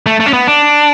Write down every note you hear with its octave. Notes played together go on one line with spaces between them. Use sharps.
A3
A3
C#4
B3
D4